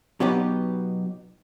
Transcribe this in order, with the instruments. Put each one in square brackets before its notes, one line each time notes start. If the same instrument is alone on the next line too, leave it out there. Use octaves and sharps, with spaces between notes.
[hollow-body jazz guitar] B2 F#3 B3 D#4 G4